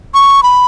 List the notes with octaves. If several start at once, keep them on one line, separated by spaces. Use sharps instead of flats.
C#6
B5